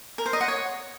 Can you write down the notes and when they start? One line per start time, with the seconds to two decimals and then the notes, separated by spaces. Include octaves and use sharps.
0.18 A#4
0.26 C5
0.33 D#5
0.41 F#5
0.48 C#5